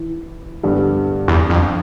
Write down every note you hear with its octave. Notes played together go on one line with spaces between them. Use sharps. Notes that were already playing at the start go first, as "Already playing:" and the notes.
Already playing: E3
G2 D3 G3 B3 D4
E2
F2